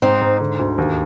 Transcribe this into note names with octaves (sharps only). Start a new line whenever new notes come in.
G#2 C4 D#4
G#2
D3
D2
D#2